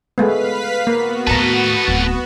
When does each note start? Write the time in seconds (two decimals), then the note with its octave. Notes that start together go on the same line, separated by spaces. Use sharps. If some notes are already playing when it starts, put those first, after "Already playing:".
0.18 G#3 A3 B3 B4 F5 B6
0.87 A#3 B3 F#4
1.27 D#2 A2 A4 B4 A5 A#5
1.88 D1